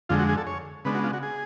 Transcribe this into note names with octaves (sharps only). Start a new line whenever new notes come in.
F2 D3 G#3 F4
F#4
G#4
A4
C#5
C#3 G#3 B3 D4 B4
F#4
F4
F#4
G#4